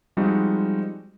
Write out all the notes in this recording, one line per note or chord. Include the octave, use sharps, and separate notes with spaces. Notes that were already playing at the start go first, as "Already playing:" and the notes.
F3 G3 G#3 C4 D#4 F#4